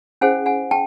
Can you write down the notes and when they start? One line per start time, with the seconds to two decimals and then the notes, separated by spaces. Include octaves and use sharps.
0.21 C#4 E4 G#4 C5 F#5 G#5
0.46 F#5 G#5
0.71 G5 A5